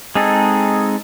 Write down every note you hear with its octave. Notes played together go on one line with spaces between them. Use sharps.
G#3 C4 D#4 G#4 A4